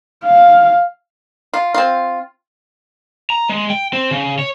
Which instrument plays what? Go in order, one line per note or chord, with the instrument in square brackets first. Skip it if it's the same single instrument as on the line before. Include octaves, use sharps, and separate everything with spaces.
[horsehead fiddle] F5
[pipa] F4
C4 F4
[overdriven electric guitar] A#5
G#3
G5
C4
C#3
C#5